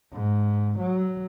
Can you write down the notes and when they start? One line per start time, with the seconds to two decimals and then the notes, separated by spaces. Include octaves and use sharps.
0.13 G#2
0.78 F#3